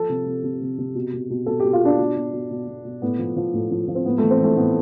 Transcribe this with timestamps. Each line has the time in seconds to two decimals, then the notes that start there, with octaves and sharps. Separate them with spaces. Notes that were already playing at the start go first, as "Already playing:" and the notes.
Already playing: F3 A4
0.09 C3
0.26 C3
0.43 C3
0.61 C3
0.78 C3
0.95 B2
1.13 B2
1.30 B2
1.46 B2 A4
1.60 B2 G4
1.73 F4
1.82 B2 D4
1.99 B2
2.16 B2
2.33 B2
2.51 B2
2.67 B2
2.85 B2
3.02 A2 B3
3.19 F3
3.37 F3
3.54 A2
3.71 F3
3.88 F3
3.95 C4
4.05 A2 B3
4.18 E3 A3
4.31 C4
4.40 E3 A3
4.57 A2 B3